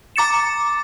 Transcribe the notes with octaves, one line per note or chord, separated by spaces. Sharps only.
A#5 D6 A6 C#7 E7